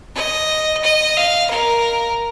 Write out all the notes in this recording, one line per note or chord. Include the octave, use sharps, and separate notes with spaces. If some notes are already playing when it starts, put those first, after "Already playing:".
D#5
D#5
F5
A#4